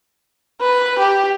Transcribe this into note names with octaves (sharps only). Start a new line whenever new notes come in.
B4
G4